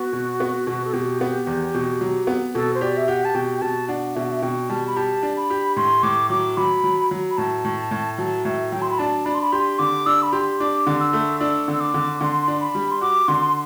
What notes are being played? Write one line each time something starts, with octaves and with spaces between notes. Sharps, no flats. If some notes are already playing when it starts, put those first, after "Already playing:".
Already playing: B3 F#4
B2
B3
B2
A4
B2 G4
B3
E2
B2
F#3
B3
B2 A4
C5
G4 D5
E5
G4 F#5
A5
B2 G5
G5
B2 A5
D4 F#5
B2 E5
F#5
E5
B2 G5
G3 A5
B5
G4 A5
D4
B5
G4
A2 C6
A2 D6
F#3 D6
F#3 B5
F#3
F#3
B5
A2 A5
A2
A2
F#3 A5
A2 E5
F#3 G5
C6
B5
D4 A5
D4 B5
C6
B5
G4 C6
D3 D6
D4 E6
B5
G4 C6
D4 D6
D3
E6
A3
D4 E6
D3
E6
D6
D3
D3 C6
D4
B5
G3
C6
F#4 D6
D3 C6